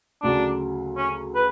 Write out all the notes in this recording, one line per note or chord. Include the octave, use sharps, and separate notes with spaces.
D2 C#3 F#3 D4
C#4
B4